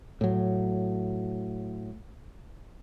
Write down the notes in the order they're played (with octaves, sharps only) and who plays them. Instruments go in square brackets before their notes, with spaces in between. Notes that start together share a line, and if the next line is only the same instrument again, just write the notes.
[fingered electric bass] A2 F#3